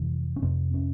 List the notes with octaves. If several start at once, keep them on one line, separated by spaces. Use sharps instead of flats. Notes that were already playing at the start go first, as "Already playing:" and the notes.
Already playing: F2 C3 E3
C#4
F2 C3 C4
C#4